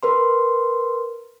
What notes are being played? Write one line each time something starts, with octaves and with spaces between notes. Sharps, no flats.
A#4 B4 C6